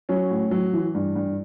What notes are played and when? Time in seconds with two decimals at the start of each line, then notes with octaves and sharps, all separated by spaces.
0.09 F#3 C#4
0.30 A2
0.51 F#3
0.73 E3
0.94 G2
1.16 G2